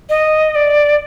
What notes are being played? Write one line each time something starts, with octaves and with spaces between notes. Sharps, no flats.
D#5
D5